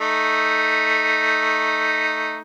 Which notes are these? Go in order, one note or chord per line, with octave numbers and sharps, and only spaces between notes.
A3 D#4